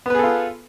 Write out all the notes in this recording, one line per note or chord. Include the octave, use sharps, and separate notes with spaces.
B3 F4 G#4 A4 B4